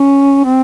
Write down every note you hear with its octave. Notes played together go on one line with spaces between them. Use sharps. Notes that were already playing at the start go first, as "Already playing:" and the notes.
Already playing: C#4
C4